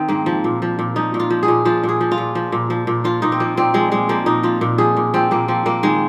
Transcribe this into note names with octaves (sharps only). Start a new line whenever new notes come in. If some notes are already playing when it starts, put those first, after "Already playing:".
Already playing: D#3 C4
G#2 A#3
F3
A#2
F3
A#2
F3 D#4
A#2
F4
F3
G#4
A#2
F3 F4
A#2
G#4
F3
F4
A#2
F3
A#2
F3
A#2
F3 F4
A#2 D#4
C4
F3 A#3
A#2 C4
F3 G#3
A#2 G#3
F3 A#3
A#2 D#4
F3 F4
A#2
F3 G#4
A#2
F3 C4
A#2 A#3
F3 C4
A#2 A#3
D#3 G#3